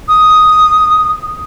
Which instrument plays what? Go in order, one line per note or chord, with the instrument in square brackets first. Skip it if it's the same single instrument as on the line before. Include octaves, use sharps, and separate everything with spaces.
[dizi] D#6